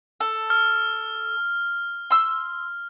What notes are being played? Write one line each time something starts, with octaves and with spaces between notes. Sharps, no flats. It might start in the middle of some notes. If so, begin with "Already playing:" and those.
A4
F6
C6 E6